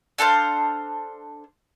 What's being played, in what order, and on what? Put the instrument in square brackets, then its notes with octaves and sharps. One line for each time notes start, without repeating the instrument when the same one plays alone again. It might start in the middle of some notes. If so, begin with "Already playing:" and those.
[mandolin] D4 A4 C5 F5